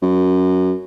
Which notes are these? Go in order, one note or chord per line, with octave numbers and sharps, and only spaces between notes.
F#2